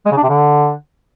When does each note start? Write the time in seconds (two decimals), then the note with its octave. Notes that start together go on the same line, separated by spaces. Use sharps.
0.06 G#3
0.12 C#3
0.17 D4
0.23 C3
0.29 D3